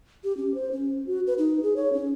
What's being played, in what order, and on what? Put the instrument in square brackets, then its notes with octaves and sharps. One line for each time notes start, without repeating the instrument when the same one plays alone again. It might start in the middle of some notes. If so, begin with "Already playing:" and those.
[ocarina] G4
C#4
C5
C#4
F#4
B4
D#4
G#4
C#5
C#4